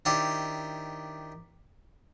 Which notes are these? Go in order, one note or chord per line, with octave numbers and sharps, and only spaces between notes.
D#3 D4 E4 G4 C5